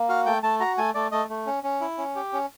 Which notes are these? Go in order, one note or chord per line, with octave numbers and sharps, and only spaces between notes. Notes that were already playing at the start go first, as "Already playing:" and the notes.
Already playing: A#3
F#4 F5
A3 G5
A3 A5
F#4 A#5
A3 G#5
A3 D5
A3 D#5
A3
C#4
C#4
E4
C#4
G4
C#4